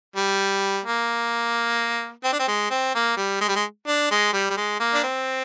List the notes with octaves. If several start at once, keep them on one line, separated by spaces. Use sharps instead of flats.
G3
A#3
C4
D4
C4
G#3
C4
A#3
G3
G#3
G3
G#3
D4
G#3
G3
G3
G#3
A#3
D4
C4